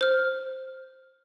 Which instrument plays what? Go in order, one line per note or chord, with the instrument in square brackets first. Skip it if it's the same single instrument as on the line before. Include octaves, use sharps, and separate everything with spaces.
[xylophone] C5 F6